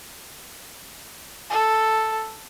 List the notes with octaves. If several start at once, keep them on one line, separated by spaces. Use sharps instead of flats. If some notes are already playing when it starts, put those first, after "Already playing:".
A4